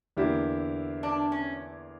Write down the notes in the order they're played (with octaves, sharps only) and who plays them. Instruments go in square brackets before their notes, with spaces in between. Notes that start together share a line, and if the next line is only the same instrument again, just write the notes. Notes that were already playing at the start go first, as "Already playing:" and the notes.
[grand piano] E2 D3 A#3 E4 G4
[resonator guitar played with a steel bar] D4
C#4